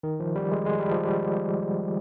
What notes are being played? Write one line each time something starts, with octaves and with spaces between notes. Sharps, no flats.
D#3
F3
G3
G#3
G#3
G3
F3
G3